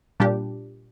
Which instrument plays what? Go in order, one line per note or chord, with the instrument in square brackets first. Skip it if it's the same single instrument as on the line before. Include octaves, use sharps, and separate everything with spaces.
[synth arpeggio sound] A#2 G3 D4 G4